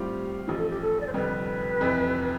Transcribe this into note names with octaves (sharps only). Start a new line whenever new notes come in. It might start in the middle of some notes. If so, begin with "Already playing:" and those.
Already playing: A2 G3 C4 F4 G4
A1 G2 F3 G4
A4
G4
A4
D5
C5
F1 F2 D3 G3 B4
F1 F2 C3 E3